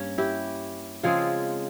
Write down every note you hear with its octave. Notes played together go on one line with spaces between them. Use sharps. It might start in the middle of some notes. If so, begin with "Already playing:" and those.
Already playing: G2 A#3 C#4
E4 G4
C#3 F3 G#3 C4 F4 G#4